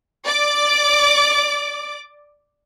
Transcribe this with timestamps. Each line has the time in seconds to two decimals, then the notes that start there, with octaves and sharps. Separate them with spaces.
0.25 D5 D6